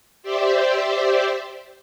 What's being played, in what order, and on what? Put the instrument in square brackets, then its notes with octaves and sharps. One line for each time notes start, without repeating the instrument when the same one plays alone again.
[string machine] G4 C5 D5 E5